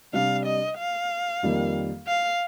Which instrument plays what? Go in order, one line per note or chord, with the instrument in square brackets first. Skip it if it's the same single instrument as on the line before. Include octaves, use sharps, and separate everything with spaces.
[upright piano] C3 G3 D4 [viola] F5
[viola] D#5
F5
[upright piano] F2 D#3 G3 A#3
[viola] F5